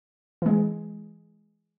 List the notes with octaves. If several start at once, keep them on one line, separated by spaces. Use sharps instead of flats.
E3 G#3